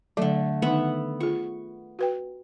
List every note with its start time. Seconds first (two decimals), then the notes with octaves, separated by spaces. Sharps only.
0.17 D3 F#3 A3
0.62 D#3 B3 D#4 E5 F#5
1.20 F4 G#4 C#6
1.99 F#4 B4 G5